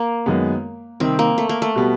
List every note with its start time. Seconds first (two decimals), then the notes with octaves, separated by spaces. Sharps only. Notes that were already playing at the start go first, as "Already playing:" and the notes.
Already playing: A#3
0.26 F#2 D#3 G#3 B3
1.00 C3 D#3 G3 C4
1.19 A#3
1.38 A3
1.49 A#3
1.62 A3
1.76 B2 G3 B3